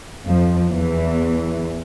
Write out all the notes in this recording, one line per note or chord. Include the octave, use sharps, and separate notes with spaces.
F2 F3
E2 E3